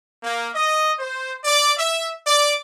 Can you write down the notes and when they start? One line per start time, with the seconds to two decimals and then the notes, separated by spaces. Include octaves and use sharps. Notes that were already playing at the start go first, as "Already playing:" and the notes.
0.23 A#3
0.54 D#5
0.98 C5
1.45 D5
1.76 E5
2.26 D5